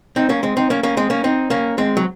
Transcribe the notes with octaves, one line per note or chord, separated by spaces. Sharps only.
C4 D#4
A#3 C#4
G#3 C4
C4 D#4
A#3 C#4
A#3 C#4
G#3 C4
A#3 C#4
C4 D#4
A#3 C#4
G#3 C4
F#3